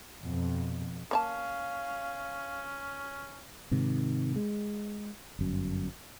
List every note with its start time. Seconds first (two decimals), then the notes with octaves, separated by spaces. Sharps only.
0.22 F2 B2
1.11 A#3 C#4 C#5 F5 A5
3.71 G#2 C3 D#3
4.36 G#3
5.39 G1 F#2